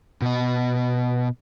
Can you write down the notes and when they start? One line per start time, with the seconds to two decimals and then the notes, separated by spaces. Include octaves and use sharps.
0.22 B2 D#5